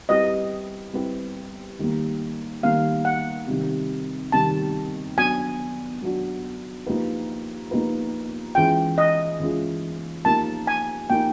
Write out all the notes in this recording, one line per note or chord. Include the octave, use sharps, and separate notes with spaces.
G3 C4 E4 G4 B4 D#5
G3 C4 E4 G4 B4
D#3 G3 A#3
D#3 G3 A#3 F5
F#5
C3 D#3 G3
C3 D#3 G3 A5
F#3 B3 D4 F#4 G#5
F#3 B3 D4 F#4
F3 A#3 D#4 G4 B4
F3 A#3 D#4 G4 B4
E3 G#3 C#4 F4 G#4 G5
D#5
E3 G#3 C#4 F4 G#4
F3 A#3 D#4 G4 A#4 A5
G#5
F3 A#3 D#4 G4 A#4 G5